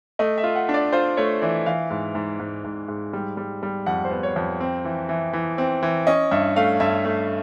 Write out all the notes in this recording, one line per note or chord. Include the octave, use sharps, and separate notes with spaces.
A3 D#5
E5
F4
F#5
D4
D5
F4 C5
A3 C#5
E3 D5
E3 F5
G#2
G#2
G#2
G#2
G#2
G3
G3
G3
F2 F#5
C5
B3
C#5
F2
C4
E3
E3
E3
C4
E3
C#4 D#5
G2 E5
A3 F5
G2 E5
A3